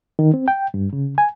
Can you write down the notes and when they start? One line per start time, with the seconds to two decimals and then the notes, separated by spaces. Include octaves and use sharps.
0.19 D#3
0.34 C4
0.48 G5
0.74 G2
0.93 C#3
1.18 G#5